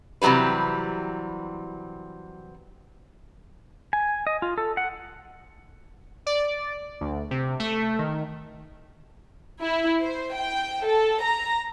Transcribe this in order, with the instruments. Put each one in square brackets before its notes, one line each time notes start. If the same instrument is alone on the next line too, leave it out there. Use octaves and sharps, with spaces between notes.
[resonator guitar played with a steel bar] C3 E3 F#3 G3 B4
[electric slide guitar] G#5
D#5
F4
A4
F#5
[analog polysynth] D5
D2
C3
A3
D#3
[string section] E4
C5
G5
A4
A#5